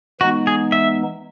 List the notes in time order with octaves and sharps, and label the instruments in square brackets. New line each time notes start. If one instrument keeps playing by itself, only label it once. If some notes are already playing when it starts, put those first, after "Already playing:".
[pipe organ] E3 G#3 B3 D#4 [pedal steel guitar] F#4
[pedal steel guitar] G#4
E5